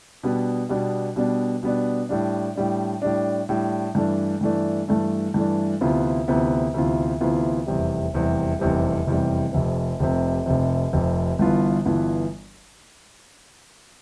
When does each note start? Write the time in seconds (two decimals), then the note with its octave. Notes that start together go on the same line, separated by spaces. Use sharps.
0.23 B2 G3 B3 D4
0.69 B2 G3 B3 D4
1.16 B2 G3 B3 D4
1.63 B2 G3 B3 D4
2.09 A2 G3 D4
2.56 A2 G3 D4
3.02 A2 G3 D4
3.49 A2 G3 D4
3.95 G2 E3 A3 D4
4.41 G2 E3 A3 D4
4.88 G2 E3 A3 D4
5.34 G2 E3 A3 D4
5.81 D2 C3 E3 B3 F4
6.27 D2 C3 E3 B3 F4
6.74 D2 C3 E3 B3 F4
7.20 D2 C3 E3 B3 F4
7.67 F1 E2 C3 G3
8.14 F1 E2 C3 G3
8.59 F1 E2 C3 G3
9.06 F1 E2 C3 G3
9.53 F1 F2 C3
10.00 F1 F2 C3
10.46 F1 F2 C3
10.93 F1 F2 C3
11.39 G1 G2 E3 B3 F4
11.85 G1 G2 E3 B3 F4